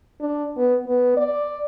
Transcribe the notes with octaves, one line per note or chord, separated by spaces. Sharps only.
D4
B3
B3
D5